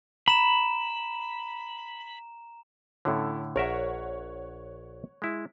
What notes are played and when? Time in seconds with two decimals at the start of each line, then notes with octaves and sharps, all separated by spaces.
0.28 A#5 B5 E7
3.05 A2 D3 C#4 E4 A4
3.56 A#1 A#4 C#5 E5 F#5
5.22 G#3 E4